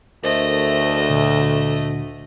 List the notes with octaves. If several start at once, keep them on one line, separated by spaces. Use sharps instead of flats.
D2 A3 A#4 C5 D#5
A#2 D3